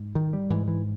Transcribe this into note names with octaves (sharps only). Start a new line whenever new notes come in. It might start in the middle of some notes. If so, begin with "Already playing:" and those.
Already playing: G#2
D#3
G3
G#2 E3
E3